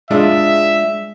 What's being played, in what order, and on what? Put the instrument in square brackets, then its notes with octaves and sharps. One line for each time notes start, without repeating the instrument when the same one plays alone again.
[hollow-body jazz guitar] G#3 D4 F4 [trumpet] E5